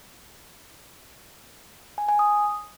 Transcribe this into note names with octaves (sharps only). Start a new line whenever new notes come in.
G#5
G#5
D#6